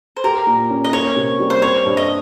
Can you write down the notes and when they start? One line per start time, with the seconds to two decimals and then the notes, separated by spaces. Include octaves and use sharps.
0.17 C5
0.24 G4 A#4
0.47 A#2
0.70 C#4
0.84 D#5
0.93 A#3 C#5
1.17 C3
1.40 G3
1.50 C5
1.62 C4 C#5
1.85 G2
1.97 D#5